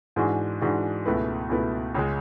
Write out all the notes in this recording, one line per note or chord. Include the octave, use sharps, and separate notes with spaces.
G#2 E3 G#3 D4 F#4
G#2 E3 G#3 D4 F#4
C#2 B2 A3 E4 B4
C#2 B2 A3 E4 B4
C#2 C#3 G#3